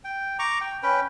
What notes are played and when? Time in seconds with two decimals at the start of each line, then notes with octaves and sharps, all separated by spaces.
0.04 G5
0.39 A#5 C#6 D6
0.61 G5
0.83 C#4 B4 G5